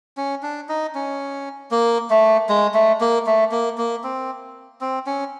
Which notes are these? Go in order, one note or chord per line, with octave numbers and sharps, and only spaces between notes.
C#4
D4
D#4
C#4
A#3
A3
G#3
A3
A#3
A3
A#3
A#3
C4
C4
C#4